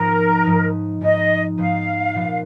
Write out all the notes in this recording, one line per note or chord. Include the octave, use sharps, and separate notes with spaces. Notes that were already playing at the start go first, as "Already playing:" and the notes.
Already playing: G#2 F3 B3 D#4 A#4
G#2 F3 B3 D#4
G#2 F3 B3 D#4 D#5
G#2 F3 B3 D#4 F5
A#2 F3 B3